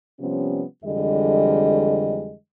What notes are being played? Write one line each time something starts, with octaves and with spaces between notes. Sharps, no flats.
C3 F3 G3 B3 C#4
F2 D3 E3 G3 G#3 D#5